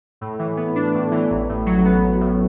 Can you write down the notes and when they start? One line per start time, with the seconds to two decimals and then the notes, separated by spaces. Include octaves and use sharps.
0.21 A2
0.39 E3
0.57 B3
0.76 D4
0.94 A2
1.11 E3
1.30 A1
1.49 A2
1.66 F#3
1.85 B3
2.04 A1
2.21 A2